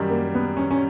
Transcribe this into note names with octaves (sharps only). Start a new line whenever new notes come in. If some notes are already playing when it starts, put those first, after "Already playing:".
Already playing: F#2 D#3 G3
A#3
B3
C#4
C#4